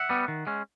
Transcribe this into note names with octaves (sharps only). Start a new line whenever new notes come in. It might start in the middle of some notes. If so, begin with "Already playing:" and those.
Already playing: E5 F#5
G3 B3
D#3
G#3 C#4